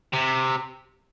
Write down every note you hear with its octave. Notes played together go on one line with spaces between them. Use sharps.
C3